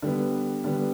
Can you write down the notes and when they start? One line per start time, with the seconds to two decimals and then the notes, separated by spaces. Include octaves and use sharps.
0.02 D3 G3 B3
0.64 D3 G3 B3